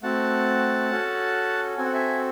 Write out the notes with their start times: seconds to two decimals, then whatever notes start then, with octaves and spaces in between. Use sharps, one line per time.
0.02 A3 C4 F#4 F#5 A5
0.91 C#4 F#4 A4
1.77 C4 F#4 A4 G#5
1.85 F#5
1.94 E5 G#5